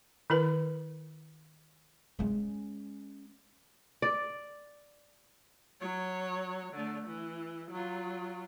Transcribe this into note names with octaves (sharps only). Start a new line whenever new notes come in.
D#3 E4 A#4 B4
G#3 C#4
D5
F#3 C#5
D3 A3
E3
F#3 F4